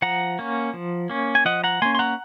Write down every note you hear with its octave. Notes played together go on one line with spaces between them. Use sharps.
F3 F#5 A#5
A#3 C#4
F3
A#3 C#4
G#5
F3 D#5 F#5
F#5 A#5
A#3 C#4 G#5 C6
C6
F#5 A#5